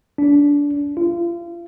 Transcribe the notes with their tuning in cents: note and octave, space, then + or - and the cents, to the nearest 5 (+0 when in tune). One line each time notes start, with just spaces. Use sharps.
D4 -25
F4 -35